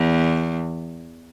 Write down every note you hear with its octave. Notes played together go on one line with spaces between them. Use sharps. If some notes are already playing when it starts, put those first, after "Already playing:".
Already playing: E2